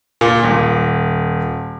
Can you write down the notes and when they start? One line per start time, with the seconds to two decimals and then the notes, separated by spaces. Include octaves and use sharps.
0.21 A#2
0.44 D#1